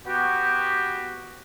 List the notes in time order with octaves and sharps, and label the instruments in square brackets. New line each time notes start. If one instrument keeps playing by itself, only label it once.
[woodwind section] B3 F#4 G4